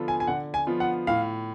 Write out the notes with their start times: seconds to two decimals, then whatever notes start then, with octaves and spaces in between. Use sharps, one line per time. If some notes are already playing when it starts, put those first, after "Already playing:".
Already playing: D3 F3 B3 F4 A4
0.08 G#5
0.20 G#5
0.27 D3 F#5
0.54 G#5
0.67 F3 B3 F4
0.80 F#5
1.07 A2 F5